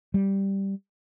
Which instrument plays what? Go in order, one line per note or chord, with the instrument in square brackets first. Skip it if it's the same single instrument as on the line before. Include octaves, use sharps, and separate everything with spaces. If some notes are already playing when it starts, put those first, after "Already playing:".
[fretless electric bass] G3